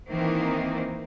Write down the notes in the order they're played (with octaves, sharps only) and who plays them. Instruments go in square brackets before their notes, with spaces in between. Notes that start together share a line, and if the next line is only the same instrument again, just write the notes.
[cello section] D#3 E3 A#3 C4